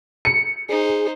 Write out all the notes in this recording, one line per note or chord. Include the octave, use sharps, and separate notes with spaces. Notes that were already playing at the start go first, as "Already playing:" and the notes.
C#7
D#4 G#4 C5